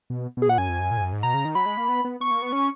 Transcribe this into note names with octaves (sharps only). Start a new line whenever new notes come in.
B2
B2 G#4
A#2 F#5
F#2 G#5
F2
F#2
A#2
G#2
F#2
G#2
B2 A#5
C#3
D#3
F#3 B5
G#3
A#3
B3
B3
B3 C#6
A#3
B3
C#4